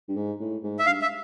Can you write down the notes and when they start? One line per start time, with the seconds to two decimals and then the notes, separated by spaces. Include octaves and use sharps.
0.08 G2
0.16 G#2
0.40 A2
0.63 G#2
0.79 E5
0.86 G2 F5
1.02 E5